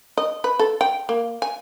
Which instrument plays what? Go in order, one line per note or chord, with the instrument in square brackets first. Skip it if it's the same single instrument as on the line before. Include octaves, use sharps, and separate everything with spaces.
[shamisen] D#5
B4
A4
G5
A#3
G#5